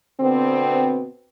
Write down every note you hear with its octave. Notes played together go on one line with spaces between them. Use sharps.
B2 D3 B3 C4